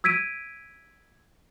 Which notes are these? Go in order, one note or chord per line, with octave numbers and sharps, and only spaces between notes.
E6 G#6 B6 D7 D#7